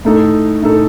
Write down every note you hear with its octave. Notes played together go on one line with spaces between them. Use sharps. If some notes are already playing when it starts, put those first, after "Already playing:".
A2 A3 D#4 A4
A2 A3 D#4 A4